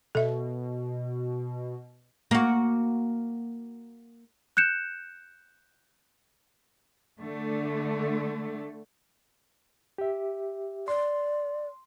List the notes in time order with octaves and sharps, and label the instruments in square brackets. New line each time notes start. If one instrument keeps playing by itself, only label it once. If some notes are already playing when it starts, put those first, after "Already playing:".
[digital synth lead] B2 [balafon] A4 E5
[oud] A#3 F#4
[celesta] F#6 G6 C#7 E7
[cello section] D3 A3
[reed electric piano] G4 E5
[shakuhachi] D5 [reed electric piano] C6